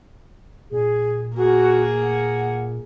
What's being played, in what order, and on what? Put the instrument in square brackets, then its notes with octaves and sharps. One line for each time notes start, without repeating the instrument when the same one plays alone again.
[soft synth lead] A#2 [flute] G#4
[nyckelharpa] A#3 G#4 [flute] F#4
[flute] F#5